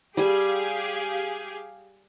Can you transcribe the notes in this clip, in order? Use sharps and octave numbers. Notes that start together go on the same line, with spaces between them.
G3 G4 G#4 F5 G#5 C6